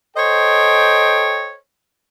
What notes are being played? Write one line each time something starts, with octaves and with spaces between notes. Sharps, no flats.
A4 C5 C#5 D#5 G5